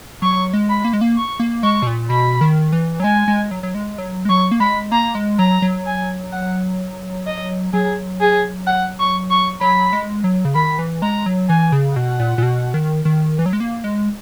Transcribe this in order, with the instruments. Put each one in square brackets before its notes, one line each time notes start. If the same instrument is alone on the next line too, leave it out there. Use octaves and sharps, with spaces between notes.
[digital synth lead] F#3 [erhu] C#6
[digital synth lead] G#3
[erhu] B5
[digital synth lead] A#3
G#3
A#3
[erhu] C#6
[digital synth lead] A#3
[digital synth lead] G#3 [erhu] C#6
[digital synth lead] B2
A#2
[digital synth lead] B2 [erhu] B5
[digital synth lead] D#3
E3
F#3
[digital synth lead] G#3 [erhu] G#5
[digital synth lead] G#3
F#3
F#3
G#3
F#3
G#3
[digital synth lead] F#3 [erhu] C#6
[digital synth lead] A#3
[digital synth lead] G#3 [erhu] B5
[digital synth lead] A#3 [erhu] A#5
[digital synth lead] G#3
[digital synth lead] F#3 [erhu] A#5
[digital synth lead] F#3
[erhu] G#5
F#5
D#5
[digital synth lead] F#3 [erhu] G#4
[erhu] G#4
F#5
C#6
C#6
[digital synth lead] F#3 [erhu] B5
[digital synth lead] G#3
F#3
C#3
[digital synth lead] D#3 [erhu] B5
[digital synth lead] E3
[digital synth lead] G#3 [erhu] A#5
[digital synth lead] F#3
[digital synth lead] E3 [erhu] G#5
[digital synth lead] C#3
[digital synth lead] B2 [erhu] F#5
[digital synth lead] A#2
A#2
B2
D#3
D#3
E3
F#3
G#3
A#3
G#3